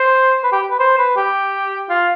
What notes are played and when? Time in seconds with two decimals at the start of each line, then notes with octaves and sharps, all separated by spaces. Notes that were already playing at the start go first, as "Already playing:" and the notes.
Already playing: C5
0.43 B4
0.52 G4
0.70 B4
0.80 C5
0.98 B4
1.16 G4
1.89 F4